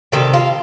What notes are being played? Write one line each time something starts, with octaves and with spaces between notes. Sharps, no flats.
C3 D#3 G3 A4
F4